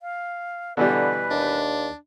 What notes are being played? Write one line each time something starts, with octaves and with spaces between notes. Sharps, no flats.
F5
B2 D3 E3 G3 B4
D#2 D4